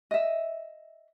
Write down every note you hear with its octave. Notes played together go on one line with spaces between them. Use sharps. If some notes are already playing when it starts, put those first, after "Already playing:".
D#5 E5